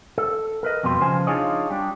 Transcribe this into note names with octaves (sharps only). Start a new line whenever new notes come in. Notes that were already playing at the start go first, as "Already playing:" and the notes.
A4
A#4 B4 D#5
F2 B2 G3 B4 C6
C#3 F3 C5 G#5
D4 D#4 F4 G#4 C#5 D#5
G3 D4